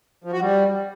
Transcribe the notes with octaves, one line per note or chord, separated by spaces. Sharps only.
F3
F#4
G3